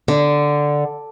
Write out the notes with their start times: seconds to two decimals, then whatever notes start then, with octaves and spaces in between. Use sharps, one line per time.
0.08 D3